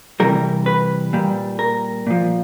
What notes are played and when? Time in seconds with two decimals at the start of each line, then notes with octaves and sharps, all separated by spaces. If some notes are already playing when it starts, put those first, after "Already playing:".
0.20 C3 E3 G3 A#4
0.66 B4
1.13 A#2 G3
1.59 A#4
2.07 A#2 F3